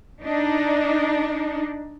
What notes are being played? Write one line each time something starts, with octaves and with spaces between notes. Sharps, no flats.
D4 D#4